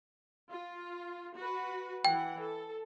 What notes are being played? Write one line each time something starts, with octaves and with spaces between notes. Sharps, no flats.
F4
F#4 B4
E3 F#5 G5
A4